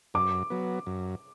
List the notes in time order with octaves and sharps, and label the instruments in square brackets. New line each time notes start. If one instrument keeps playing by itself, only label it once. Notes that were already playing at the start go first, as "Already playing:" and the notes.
[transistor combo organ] F#2 [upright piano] D6
[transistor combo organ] F#3 B3
F#2